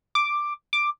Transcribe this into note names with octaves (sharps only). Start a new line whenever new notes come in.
D6
D6